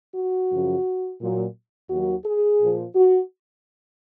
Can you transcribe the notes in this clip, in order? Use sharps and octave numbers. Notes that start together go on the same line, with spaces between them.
F#4
F#2 C#3 F3
A#2 F#3
D#2 D#3 F#3 F#4
G#4
A#2 F3
F#4